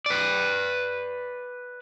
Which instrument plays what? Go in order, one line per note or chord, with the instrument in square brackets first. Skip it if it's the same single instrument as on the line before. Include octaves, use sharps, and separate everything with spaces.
[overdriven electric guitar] B4 D5